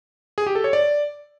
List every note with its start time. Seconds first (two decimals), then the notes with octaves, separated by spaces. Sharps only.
0.38 G#4
0.47 G4
0.55 A4
0.64 C#5
0.73 D5